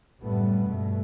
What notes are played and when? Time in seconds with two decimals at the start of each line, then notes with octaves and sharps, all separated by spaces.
0.21 F#1 A2 G3 A3 B3
0.67 G2 B2 A3